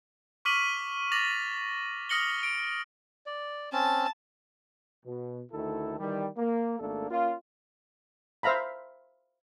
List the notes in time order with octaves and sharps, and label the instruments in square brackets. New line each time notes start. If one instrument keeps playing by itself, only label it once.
[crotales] C#6 D6 F6 B6 D#7 F#7
D6 A6 A#6 F7 F#7
D#6 F6 A#6 C#7 F#7 G7
D7
[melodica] D5
[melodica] C4 C#4 [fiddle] A5
[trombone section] B2
D2 D#3 A3 E4 A4
D#3 E3 G3
A#3
G#1 A3 A#3 D4 A4
A#3 C#4 F4
[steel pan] C5 E5 F5 A#5 B5